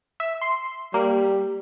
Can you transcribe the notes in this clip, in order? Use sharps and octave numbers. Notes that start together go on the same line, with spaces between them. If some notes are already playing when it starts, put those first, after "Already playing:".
E5
C6
G3 A#3